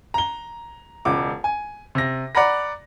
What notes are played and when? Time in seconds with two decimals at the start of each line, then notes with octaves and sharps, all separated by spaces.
0.14 A#5 G7
1.05 E1 C#2 D6
1.44 G#5
1.95 C3 A#6
2.35 D5 F#5 A#5 B5 A#6